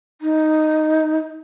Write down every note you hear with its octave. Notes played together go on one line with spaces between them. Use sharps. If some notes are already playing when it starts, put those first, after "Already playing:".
D#4